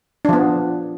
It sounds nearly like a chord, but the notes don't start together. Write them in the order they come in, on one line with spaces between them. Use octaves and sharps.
D4 F3 B3